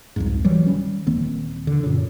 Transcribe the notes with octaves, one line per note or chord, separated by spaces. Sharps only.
C2 F2 G#2
E3 F#3 G3
D#3 G3 C#4
D#1 D#3 A#3 C4
D3
F#2 A#2 C#3